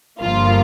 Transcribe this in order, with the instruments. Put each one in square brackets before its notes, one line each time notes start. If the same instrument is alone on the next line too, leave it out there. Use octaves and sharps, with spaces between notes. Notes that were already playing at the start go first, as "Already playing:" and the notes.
[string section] G1 G2 F3 A#3 F4